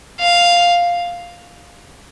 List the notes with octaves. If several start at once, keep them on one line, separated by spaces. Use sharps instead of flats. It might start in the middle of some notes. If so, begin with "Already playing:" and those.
F5